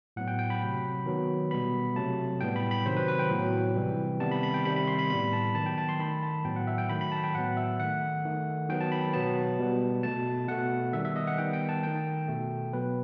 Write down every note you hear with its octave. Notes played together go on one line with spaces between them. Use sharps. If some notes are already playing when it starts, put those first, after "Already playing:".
A2 F#3 B3 F#5
G5
G5
B5
C3 F#3 A3
D#3 F#3 B3
B2 G3 B3 B5
C3 F#3 A3 A5
A2 G3 B3 G5
B5
B5
C3 D#3 F#3 C5
B4
B4
G5
A2 F#3 B3
C3 E3 G3
C3 D#3 G3 B3 A5
B5
B5
G5
C3 D#3 G3 B5
B5
C6
B5
A2 G3 B3 B5
A5
D#3 F#3 B3 A5
G5
A5
C6
D#3 A3 B5
A5
A2 F#3 B3 G5
F#5
E5
G5
D#3 F#3 A3 B5
B5
A5
G5
A2 F#3 B3 F#5
E5
D#3 A3 F#5
D#3 A3
D#3 F#3 B3 G5
A5
B5
B2 F#3 B3 A5
B2 G3 B3
B2 A3 A5
B2 A3 F#5
D#3 G3 B3 E5
E5
D#5
F#5
D#3 G3 B3 G5
G5
A5
D#3 A3 G5
B2 A3
B2 F#3 B3 B4